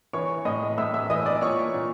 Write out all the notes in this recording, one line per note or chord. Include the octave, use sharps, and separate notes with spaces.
E3 C#5 C#6
A2 D#5 D#6
A2 E5 E6
E5 E6
E3 D#5 D#6
D5 D6
A#2 C#5 C#6
A#2